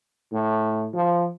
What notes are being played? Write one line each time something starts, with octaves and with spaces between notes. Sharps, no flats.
A2
F3